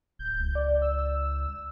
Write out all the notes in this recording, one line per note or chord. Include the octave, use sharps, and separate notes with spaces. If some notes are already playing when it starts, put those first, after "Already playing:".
D1 G6
C#2
D5
E6